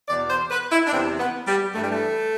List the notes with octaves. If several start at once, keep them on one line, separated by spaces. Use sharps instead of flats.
E2 B2 D5
C5
B4
E4
D4
E2 C3 E3 C4
B3
G3
G2 E3 A3
G3
A3